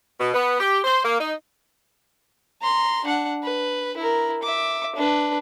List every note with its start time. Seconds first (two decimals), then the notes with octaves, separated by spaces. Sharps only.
0.19 B2
0.33 B3
0.60 G4
0.84 C5
1.04 A#3
1.19 D#4
2.62 A#5 C6
3.05 D4 F#5
3.43 B4
3.97 E4 A#4
4.43 E5 D6
4.96 D4 B4